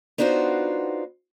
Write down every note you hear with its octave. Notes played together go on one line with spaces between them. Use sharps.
B3 D4 D#4 F4 F#4 C5